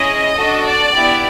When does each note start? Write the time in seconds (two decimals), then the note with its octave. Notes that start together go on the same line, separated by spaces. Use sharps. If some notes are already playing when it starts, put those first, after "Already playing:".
Already playing: C#4 E4 G#4 D#5
0.37 D4 F#4 A4
0.65 D5
0.94 B3 E4 G4